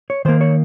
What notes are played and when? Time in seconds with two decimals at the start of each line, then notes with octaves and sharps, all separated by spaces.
0.10 C#5
0.25 D#3 A#3 C5
0.41 C#5